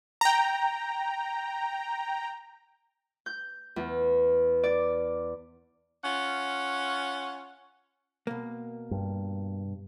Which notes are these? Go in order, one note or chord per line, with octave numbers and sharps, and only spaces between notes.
G5 A#5
G6
E2
D5
C#4 F4 F#5
B2 A#3
G2